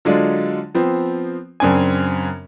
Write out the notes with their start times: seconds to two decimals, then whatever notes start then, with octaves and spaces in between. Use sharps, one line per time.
0.05 D3 F#3 G#3 D4 F4
0.75 F3 B3 C4
1.60 F#2 C#3 C4 D4 G#5